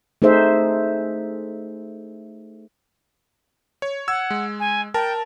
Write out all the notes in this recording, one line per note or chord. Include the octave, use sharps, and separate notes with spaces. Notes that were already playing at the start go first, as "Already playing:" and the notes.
A3 D#4 G#4 C5 E5
C#5
F#5 E6 G#6
G#3
G#5
A#4 G5 A5